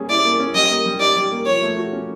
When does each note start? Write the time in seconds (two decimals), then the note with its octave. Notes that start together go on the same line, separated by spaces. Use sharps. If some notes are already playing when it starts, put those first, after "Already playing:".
Already playing: G3 A#3 C#4 G#4
0.09 E4 D5
0.24 A#3
0.40 C#4
0.54 G3 D#5
0.71 A#3
0.86 G3
1.00 D#4 D5
1.16 G3
1.31 A#3
1.46 F3 C#5
1.62 A3
1.77 F#4
1.93 C#4